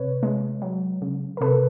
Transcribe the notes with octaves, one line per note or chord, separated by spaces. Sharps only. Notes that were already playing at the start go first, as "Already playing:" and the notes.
Already playing: C3 B4 C#5
G#3
F#3
C#3
A#4
C3 A4 B4